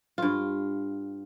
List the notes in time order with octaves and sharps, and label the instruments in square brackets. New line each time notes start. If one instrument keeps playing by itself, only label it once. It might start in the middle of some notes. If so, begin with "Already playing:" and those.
[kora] G2 F4